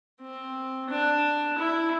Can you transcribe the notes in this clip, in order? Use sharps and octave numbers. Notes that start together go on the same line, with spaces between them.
C4
D4
E4